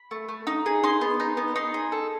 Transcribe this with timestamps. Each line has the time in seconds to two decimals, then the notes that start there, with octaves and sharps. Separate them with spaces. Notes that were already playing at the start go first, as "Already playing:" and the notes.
Already playing: B5
0.11 A3
0.28 A3
0.47 D#4
0.66 G#4
0.83 D#4 C6
1.01 B3
1.20 D#4
1.37 B3
1.55 D#4 C6
1.74 G#4
1.92 A4